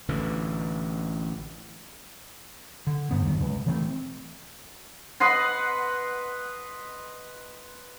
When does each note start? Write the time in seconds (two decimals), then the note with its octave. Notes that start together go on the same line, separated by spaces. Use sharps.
0.08 A1 D3 E3
2.87 D3
3.11 D2 G2 B3
3.25 D2 G2 D#3 F#3
3.40 C#2
3.66 E3 A3 C4
5.20 B4 D#5 F#5 C6